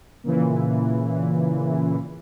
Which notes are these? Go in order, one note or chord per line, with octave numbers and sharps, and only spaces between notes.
A#2 C#3 E3